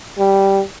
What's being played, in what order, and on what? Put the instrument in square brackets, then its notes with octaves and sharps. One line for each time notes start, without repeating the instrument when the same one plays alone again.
[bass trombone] G3